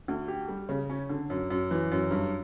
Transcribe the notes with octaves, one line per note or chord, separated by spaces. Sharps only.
D2
G4
G3
C#3
C#4
D3
F#2
F#2
E3
F#2
G2